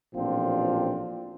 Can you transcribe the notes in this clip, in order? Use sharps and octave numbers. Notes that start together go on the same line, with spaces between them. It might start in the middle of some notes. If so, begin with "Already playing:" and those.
A1 A#2 F3 C4 D4 F4